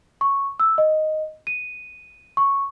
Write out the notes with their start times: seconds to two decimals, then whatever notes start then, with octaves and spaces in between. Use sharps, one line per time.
0.21 C#6
0.60 E6
0.78 D#5
1.47 D#7
2.37 C#6